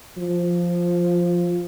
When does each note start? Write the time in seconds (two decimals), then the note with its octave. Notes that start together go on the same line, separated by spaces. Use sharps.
0.17 F3